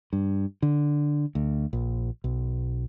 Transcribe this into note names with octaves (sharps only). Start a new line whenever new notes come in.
G2
D3
D2
A#1
B1